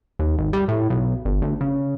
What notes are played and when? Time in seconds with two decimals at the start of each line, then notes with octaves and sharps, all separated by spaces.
0.19 D#2
0.38 G#1
0.53 G3
0.68 A2
0.90 B1
1.25 G1
1.42 D2
1.61 C#3